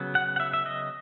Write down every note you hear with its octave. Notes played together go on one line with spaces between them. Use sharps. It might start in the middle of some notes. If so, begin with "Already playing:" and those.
Already playing: C#3 F#3 B3
F#5
F#5
E5
E5
D#5